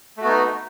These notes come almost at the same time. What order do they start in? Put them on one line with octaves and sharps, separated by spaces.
A3 F#4 B3 D#4